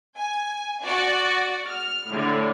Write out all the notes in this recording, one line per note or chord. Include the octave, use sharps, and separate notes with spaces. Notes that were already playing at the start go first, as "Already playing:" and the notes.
G#5
F#4 D5
F6
A2 D3